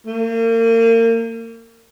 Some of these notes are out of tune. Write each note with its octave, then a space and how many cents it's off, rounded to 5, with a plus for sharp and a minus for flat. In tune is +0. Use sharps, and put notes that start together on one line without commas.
A#3 -35